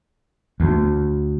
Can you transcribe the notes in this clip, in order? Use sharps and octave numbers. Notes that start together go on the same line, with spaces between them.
D2